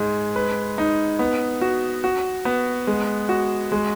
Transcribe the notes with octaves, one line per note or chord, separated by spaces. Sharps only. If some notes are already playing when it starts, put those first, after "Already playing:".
Already playing: G#2 G#3
B4
D#4
B3
F#4
F#4
B3
G#3
F#4
G#3